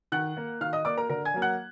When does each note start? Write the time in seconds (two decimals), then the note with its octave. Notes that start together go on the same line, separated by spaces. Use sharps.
0.12 D#3 F#5 F#6
0.37 A#3
0.61 D#3 F5 F6
0.73 D#5 D#6
0.85 A#3 D5 D6
0.97 A#4 A#5
1.09 D3 A#4 A#5
1.25 G#5 G#6
1.34 F#3 A#3
1.42 F#5 F#6